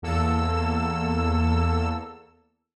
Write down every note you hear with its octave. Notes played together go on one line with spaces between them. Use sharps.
E2 A#3 A4 E6